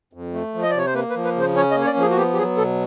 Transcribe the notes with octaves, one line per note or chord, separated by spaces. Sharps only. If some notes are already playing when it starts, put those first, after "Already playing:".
F2
A3
F3
D#5
D5
C3 C#5
C5
A#3 B4
B4
F3
B4
C#3 C5
C#4 C#5
D#5
A#3
C#5
D5
F3
G#4
F#4
B3 G4
G4
F#3 G#4
B2 A4